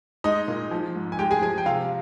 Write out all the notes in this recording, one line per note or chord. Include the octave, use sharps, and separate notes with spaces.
G#3 D#4 D#5
A#2
F3
G#2
G#5
G#3 G4 G5
G#4 G#5
F3 G#4 G#5
G5
C3 F4 F5